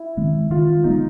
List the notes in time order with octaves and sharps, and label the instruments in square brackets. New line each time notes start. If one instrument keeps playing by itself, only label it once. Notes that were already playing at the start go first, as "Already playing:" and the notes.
Already playing: [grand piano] E4
[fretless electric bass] D#3 G#3 C4
[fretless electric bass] D#3 [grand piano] F4
[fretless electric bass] G#3 B3 [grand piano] D#4